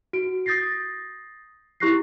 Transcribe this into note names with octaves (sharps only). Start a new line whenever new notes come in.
F#4 D7
D#6 G6 A6 A#6 C7
E4 G4 C#6 F#6 A#6 C7